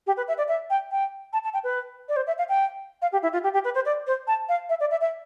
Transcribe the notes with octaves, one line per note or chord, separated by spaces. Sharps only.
G4
B4
E5
D5
E5
G5
G5
A5
A5
G5
B4
D5
C5
E5
F5
G5
F5
G4
E4
F4
G4
G4
B4
C5
D5
C5
A5
F5
E5
D5
E5
E5